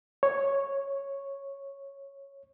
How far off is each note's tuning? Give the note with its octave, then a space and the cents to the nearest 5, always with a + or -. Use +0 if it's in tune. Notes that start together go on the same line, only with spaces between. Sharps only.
C#5 -5